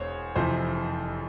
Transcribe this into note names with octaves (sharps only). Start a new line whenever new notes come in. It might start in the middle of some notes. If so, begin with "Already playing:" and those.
Already playing: E1 E2 C5 C#5
F1 F2 C3 E3 C5